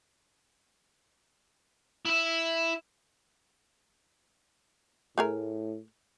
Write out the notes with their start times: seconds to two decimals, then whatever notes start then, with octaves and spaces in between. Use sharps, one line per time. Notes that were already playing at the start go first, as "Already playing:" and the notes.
2.05 E4 E5
5.18 A2 A3 G#4 A#4